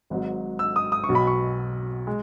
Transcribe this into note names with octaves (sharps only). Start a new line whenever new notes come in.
G#1 G#2 F#3
E6
D#6
D#6
C#6
B1 B2 F#3
B5
C#6
G#3